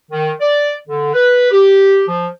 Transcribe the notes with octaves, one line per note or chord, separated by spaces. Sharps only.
D#3
D5
D3
B4
G4
F3